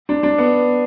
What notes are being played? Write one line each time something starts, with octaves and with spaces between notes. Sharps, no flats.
D4
D4
B3